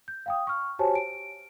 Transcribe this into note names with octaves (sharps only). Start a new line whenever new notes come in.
G6
F5 G5 D#6
C#6 F6
F#4 G4 C5 C#5 G#5 A5
D7